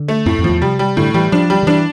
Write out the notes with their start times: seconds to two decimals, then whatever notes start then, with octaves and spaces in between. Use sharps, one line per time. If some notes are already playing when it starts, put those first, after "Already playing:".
Already playing: D3
0.08 A3
0.26 F2 A2
0.39 F2
0.44 E2 F3
0.62 C3 G3
0.79 G3
0.97 A2 D3
1.14 E3 G3
1.32 F3 D4
1.50 G3
1.63 D3
1.67 E3 D4